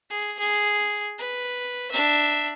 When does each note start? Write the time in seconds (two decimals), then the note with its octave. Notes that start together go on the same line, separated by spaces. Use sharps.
0.10 G#4
0.39 G#4
1.18 B4
1.91 D4 E5